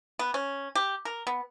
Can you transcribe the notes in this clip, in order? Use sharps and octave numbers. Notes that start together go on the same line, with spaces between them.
B3
C#4
G4
A#4
B3